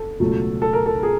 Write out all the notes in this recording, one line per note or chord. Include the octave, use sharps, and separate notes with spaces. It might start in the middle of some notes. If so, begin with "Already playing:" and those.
Already playing: A4
C#2 B2 F#3 A3
A4
A#4
A4
G#4